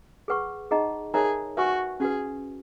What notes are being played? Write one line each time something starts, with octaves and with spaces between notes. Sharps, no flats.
G#4 B4 F#5 C#6
D#4 G#4 D#5 F#5 A#5
D#4 G#4 A#4 C#5 E5 A#5
F#4 B4 E5 G#5 C#6
C#4 F#4 G#4 B4